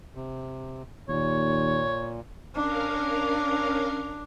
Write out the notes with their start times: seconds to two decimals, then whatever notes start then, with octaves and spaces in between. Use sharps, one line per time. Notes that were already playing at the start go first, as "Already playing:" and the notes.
0.15 C3
1.09 D#2 A#2 C#5
2.54 C#4 D4 A#4 F5